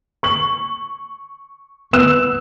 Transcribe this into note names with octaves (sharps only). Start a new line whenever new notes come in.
C#6 F#7
B3 E6 F#6 E7